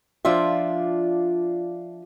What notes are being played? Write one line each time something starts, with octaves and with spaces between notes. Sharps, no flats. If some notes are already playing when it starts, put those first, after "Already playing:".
F3 D4 F4 D5 E5